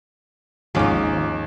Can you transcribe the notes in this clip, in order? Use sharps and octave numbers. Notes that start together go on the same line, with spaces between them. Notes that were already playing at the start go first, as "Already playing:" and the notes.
G#1 D#2 F3 G#3 C#4 D#4 D6